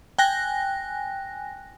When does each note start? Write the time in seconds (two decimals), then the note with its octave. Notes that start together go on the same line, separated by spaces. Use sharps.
0.18 G5 G#5 F#6 A#6